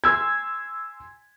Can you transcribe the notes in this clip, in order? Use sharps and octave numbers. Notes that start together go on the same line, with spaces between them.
G#5 C6 E6 G#6